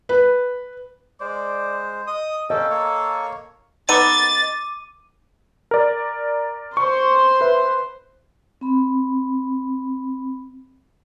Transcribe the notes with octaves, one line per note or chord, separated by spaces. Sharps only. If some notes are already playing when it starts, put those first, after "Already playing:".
B4
G#3 C5 D5
D#5 D#6
A#3 C#4 A4 D#5 G5
A#3 C#5
B3 D#4 A4 D6 A6 D#7
A#4 D5
C5 C6 C#6
B4 E5
C4 B5